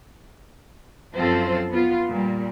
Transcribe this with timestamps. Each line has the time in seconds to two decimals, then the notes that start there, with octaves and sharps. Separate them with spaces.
1.16 F#2 F3 C4 F4 A4 C5
1.71 B3 F4
2.08 A#2 G3